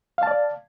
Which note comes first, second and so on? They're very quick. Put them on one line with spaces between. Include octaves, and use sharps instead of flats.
F5 A5 D5